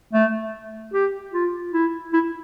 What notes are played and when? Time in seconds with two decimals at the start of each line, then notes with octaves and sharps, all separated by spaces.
0.13 A3
0.93 G4
1.33 F4
1.73 E4
2.13 E4